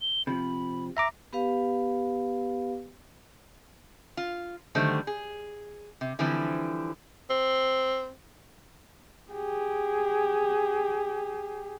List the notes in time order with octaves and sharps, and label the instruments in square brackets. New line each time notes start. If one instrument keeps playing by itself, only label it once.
[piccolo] G7
[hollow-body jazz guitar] C3 F3 [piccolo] B5
[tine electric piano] E5 A#5 D6 [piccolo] A#6
[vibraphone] B3 G4 B4 F5
[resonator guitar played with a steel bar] F4
D3 D#3 F#3 G3 A3 C5
G#4
C3
D3 E3 F3 G3 C4 E4
[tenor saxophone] C4
[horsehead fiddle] G4 G#4